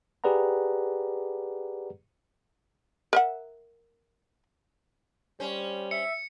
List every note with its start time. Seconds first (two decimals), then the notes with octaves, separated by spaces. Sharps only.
0.24 G4 G#4 B4 D5 F#5 A#5
3.13 A#4 E5 F#5
5.40 G3 C#4 C5
5.91 E5 C#7